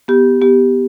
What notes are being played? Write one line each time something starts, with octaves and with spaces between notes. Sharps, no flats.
B3 G4
B3 G4